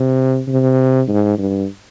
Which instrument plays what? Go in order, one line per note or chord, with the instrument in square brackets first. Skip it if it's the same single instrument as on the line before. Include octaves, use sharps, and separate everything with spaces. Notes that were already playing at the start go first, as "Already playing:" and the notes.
Already playing: [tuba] C3
C3
G#2
G2